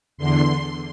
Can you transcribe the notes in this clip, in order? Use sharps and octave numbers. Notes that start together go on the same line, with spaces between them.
E2 D3 C6